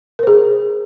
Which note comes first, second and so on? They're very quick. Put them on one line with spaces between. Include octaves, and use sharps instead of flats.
A#4 C5 G#4